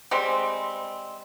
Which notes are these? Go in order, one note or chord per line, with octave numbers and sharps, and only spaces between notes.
G3 G#3 C4